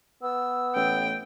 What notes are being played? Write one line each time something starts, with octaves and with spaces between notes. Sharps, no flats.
B3 E6
A1 G5